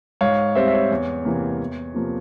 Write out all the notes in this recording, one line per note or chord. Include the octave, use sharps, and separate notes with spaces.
G#2 C#5 F5
G3 C4 C5 E5
E5
C#5
E2
C3 E3 A#3
E2
C3 F3 A#3